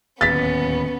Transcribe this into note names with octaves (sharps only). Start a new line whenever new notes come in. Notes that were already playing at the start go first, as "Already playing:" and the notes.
D1 D#2 B3 C#4 A6 B6